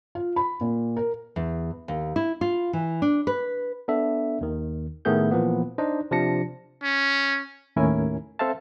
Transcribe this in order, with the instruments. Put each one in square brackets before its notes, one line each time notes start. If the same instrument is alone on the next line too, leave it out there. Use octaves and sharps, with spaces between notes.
[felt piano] F4
B5
A#2
A#4
[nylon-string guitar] E2
D#2
E4
F4
E3
D4
B4
[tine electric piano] B3 D4 A4 E5
D#2 D#3
A2 D#3 A3 B3 G#4 G6
A#2 E3 F3 A#3 B3
D4 D#4 C5 D#5
C3 F3 D4 A5 A#6 C#7
[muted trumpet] C#4
[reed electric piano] D#2 A2 C#4 E4 A#4 G#5
C4 A4 C5 E5 F5 A5